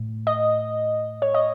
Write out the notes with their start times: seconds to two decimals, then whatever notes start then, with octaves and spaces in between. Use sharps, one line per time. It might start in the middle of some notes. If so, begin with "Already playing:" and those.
Already playing: A2
0.27 D#5
1.22 C#5
1.34 D#5